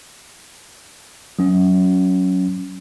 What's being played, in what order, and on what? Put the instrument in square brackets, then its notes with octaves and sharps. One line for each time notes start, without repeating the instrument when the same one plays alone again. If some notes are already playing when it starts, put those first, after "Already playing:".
[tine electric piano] F#3 C#4